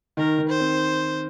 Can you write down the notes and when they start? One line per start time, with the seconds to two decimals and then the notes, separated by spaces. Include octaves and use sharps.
0.17 D#3 A#4
0.39 D#3
0.49 C5
0.60 C4